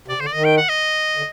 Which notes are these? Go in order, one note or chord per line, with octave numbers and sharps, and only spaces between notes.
C3 D5
D3 C5
D5
D#3 D#5
G5
F#5
D#5
D3